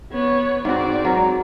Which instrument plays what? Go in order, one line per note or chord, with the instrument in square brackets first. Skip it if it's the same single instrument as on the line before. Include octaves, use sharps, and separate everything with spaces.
[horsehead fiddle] B3 C#5
[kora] G#2 F#4 [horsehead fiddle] C4 D5
[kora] F#3 A#4